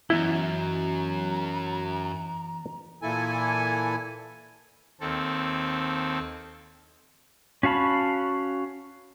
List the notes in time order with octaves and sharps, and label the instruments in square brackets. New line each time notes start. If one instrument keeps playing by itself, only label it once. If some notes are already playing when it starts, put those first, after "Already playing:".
[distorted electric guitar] F#2 [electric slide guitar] E3 B3 D#5 [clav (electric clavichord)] E4 [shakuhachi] A#5
[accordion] A#2 E3 A#3 E4 A4 G#5
[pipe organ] D#2 C4 A4
[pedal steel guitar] C#4 F#4 F5 A5 B5